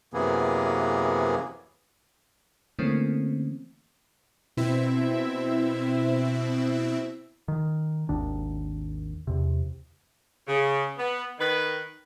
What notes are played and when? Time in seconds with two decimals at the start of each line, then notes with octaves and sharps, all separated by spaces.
0.14 F#2 C3 E3 A#3 B3 G#4
2.79 D3 E3 A3 A#3 C4 C#4
4.57 B2 C4 E4 E5
7.48 D#3
8.09 G#1 D#2 D#3 D4
9.27 E2 C3
10.48 C#3
10.98 B3
11.39 D#3 B4